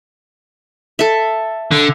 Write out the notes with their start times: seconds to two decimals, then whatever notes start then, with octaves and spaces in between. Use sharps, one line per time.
0.99 A4 E5
1.71 D3